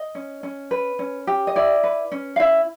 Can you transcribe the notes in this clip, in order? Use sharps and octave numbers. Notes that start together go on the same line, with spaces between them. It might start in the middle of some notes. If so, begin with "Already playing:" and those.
Already playing: D#5
C#4
C#4
B4
C#4
G4
D#5
E4 D5
B4
C#4
F5
E4 E5